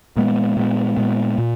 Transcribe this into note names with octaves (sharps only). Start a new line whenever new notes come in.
A#2 G#3 B3
A#2 G#3 B3
A#2 G#3 B3
A#2